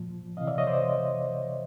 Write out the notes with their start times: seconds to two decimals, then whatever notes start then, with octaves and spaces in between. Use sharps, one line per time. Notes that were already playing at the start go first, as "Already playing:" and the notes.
Already playing: A#2 F3
0.37 C3 E3 D#5 F5
0.48 D5 E5
0.58 C#5 D#5
0.67 C5 D5